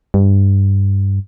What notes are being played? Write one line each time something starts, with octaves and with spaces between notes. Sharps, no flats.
G2